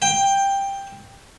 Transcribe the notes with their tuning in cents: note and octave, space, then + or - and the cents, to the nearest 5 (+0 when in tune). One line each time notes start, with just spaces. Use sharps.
G5 +10